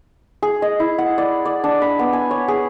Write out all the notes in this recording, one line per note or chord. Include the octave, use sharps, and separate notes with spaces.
G#4
D#5
E4
F#5
D5
D5
D4
B5
B3
G#5
C#5
G#4